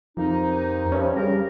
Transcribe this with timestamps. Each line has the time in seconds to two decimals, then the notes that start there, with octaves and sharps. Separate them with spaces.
0.17 F2 C3 A#3 D#4
0.92 G2 C3 F3 C#4
1.16 C#3 G3 A#4